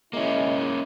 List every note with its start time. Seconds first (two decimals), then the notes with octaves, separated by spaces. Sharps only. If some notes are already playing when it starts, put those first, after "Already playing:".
0.13 G#3 A#3 C#4 E4